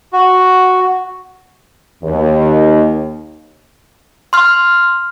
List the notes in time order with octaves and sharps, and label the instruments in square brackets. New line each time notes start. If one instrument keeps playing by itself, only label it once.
[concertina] F#4
[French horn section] D#2
[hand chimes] C6 F6